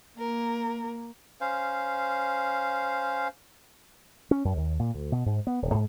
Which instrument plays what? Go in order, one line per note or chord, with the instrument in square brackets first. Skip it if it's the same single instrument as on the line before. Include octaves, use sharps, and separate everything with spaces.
[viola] A#3 [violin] A#4
[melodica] C#4 C5 F5
[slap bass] C#4
F#2
D#2
A#2
D2
B2
G#2
B3
D#1
G#2